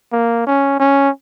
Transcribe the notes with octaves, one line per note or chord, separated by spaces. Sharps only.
A#3
C#4
C#4